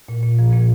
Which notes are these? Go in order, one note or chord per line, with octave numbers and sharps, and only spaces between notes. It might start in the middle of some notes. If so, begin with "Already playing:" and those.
A#2
A#2
F3
A#2